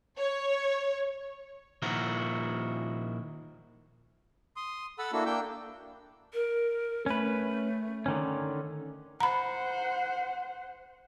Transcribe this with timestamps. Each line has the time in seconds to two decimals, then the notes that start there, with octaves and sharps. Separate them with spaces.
0.19 C#5
1.82 A#2 D#3 F3 E4 F#4 A#4
4.56 C6 D#6
4.99 A4 F#5 A5 B5 E6
5.13 A#3 D4 E4 F#4 A4 E6
5.26 A#3 D4 G5 E6 G6
6.33 A#4
7.06 A3 C#4 B4
8.06 D3 D#3 C#4
9.20 C5 F#5 A#5 B5